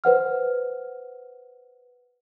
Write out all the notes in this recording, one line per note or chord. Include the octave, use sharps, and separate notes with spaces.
B4 C5 F#5 F6